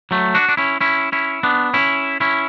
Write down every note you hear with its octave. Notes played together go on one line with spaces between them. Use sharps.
F#3 A3
D4 F#4
D4
C#4 E4
C#4 E4
C#4 E4
B3 D4
C#4 E4
C#4 E4